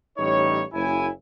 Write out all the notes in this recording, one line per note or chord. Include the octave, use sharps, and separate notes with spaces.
A1 G3 D#4 C#5
F#1 E4 G#5